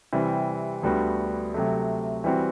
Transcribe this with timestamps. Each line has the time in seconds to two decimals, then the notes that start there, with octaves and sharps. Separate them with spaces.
0.13 C3 E3 G3 C4
0.83 D2 D3 G3 B3 F#4
1.54 C3 F#3 A3
2.24 E3 G3 C4 F#4